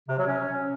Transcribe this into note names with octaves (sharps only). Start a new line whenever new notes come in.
C3
F#3
C#4